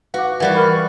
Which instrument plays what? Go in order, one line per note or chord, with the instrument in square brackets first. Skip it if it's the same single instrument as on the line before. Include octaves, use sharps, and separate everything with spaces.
[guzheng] F#4 [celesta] B4 F#5 D6 [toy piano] F5
[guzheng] E3 G3 F#4 [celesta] A#4 [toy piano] F5 F#5
[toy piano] G#4 A#4 C#5 [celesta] B5 F6
[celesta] C#6